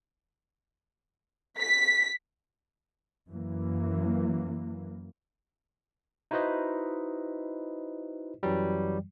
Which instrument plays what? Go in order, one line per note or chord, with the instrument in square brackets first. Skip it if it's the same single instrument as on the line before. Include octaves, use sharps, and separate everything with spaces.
[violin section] B6
[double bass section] F#2 E3 A#3
[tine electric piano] D#4 E4 F#4 B4 C5 D#5
F#2 E3 F#3 G3